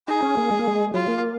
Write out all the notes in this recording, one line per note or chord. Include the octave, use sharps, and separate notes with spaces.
D#4 G#4
C#4
A#3
G#3
A#3
G#3
F#3 F4
A#3